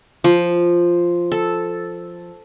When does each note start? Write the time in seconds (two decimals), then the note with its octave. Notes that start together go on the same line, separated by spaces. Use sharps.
0.24 F3
1.32 A4